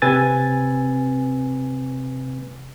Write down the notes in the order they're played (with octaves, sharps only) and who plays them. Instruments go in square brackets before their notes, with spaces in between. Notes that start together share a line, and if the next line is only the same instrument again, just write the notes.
[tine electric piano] C3 C4 B4 G#5 E6 A6